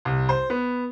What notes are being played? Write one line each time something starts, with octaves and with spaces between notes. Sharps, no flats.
C2
C5
B3